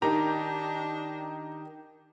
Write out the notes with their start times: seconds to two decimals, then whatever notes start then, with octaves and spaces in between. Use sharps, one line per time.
0.02 D#3 D4 D#4 G4 A#5